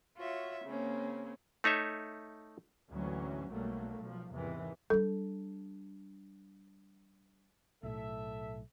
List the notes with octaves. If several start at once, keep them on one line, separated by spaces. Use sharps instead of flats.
F4 F#4 C#5 E5
C#3 A#3 C4 C#4
A3 D#4 C#5 E5
D2 G#2 E3 F#3 C#4
B1 F#3 G3 A3 A#3
B1 F3
E2 G#2 C3 D#3 E3
G3 D4 A4
B1 A2 A4 E5